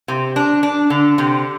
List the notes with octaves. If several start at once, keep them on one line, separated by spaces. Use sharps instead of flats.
C3
D4
D4
D3
C3